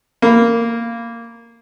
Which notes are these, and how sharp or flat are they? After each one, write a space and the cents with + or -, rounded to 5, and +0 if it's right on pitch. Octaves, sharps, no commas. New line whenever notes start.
A#3 -10 B5 +0